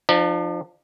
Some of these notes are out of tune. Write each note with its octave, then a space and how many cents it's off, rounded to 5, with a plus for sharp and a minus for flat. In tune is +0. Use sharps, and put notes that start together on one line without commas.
F3 +0 D4 +45